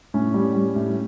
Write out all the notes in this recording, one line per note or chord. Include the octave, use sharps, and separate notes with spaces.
A2 C#4
G3
G3
A2